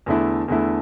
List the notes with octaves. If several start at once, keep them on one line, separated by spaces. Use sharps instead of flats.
E2 D3 A3 E4
E2 D3 A3 E4